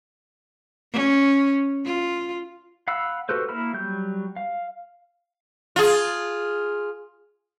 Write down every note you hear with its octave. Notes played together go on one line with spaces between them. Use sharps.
C#4
F4
F5 F#5 B5 E6
F#4 G4 A4 B4 C5
A#3 E4 B5 F6
F#3 G3 G6
F5
F4 G#4